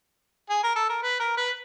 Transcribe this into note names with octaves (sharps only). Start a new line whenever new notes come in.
G#4
A#4
A4
A#4
B4
A#4
B4